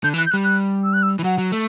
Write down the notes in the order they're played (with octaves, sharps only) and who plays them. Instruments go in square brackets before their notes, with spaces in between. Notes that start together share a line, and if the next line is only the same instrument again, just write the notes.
[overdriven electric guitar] D3 [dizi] G6
[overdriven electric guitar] E3 [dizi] F#6
[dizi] G6
F#6
[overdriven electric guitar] G3
[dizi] F#6
E6
F#6
E6
[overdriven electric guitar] E3
[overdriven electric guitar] F#3 [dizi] F#5
[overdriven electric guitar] F#3
A3